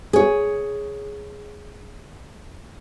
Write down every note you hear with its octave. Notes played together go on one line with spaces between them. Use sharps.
G#4 C#5